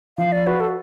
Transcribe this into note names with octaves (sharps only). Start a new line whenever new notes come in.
F3 F5
D5
F#4 B4
A4